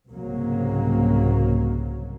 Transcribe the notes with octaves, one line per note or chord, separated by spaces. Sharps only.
C2 G#2 C#3 F#3 A#3